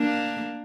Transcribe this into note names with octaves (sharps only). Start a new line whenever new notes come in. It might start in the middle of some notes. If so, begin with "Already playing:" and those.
Already playing: A#3 D4